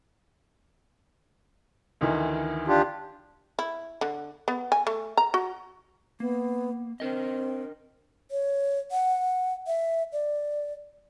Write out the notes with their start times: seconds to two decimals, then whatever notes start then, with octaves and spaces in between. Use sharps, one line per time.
2.01 D2 D#3 E3
2.67 D4 F4 G4
3.59 E4
4.01 D3
4.48 B3
4.72 G#5
4.87 A3
5.17 A#5
5.34 F#4
6.20 A#3 B3
7.00 C4 D4 A#4 D#5
8.31 C#5
8.91 F#5
9.67 E5
10.12 D5